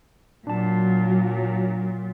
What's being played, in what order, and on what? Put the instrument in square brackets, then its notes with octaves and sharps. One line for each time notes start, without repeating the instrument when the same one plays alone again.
[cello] A#2 [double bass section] F#3 [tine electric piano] D4 A5